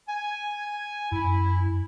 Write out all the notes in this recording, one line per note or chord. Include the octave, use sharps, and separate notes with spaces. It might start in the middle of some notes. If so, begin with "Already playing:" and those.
G#5
F#2 E4